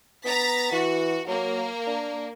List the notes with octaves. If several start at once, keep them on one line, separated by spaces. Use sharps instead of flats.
B3 A#5 A6 B6
E3 F#4
F#3 A#3
D4